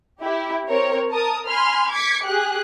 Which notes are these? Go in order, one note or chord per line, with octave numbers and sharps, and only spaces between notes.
E4 G4
C4 A#4 C#5
A#4 A5 D#6
G#5 B5 C6 F6
D6 G#6 B6 C#7
G4 G#4 F#6